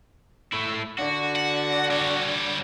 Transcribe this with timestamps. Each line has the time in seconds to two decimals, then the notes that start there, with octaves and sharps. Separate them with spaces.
0.52 A3 E4
0.98 D3 F#4
1.36 F#5
1.91 G3 C#5